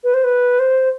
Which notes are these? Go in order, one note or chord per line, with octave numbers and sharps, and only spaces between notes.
B4
C5
B4
C5